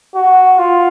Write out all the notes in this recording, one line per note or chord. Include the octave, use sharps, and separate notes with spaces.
F#4
F4